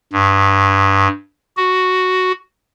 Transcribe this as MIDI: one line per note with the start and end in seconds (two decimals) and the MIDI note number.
0.13 1.08 43
1.57 2.32 66